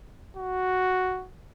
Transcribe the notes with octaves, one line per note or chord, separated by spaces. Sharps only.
F#4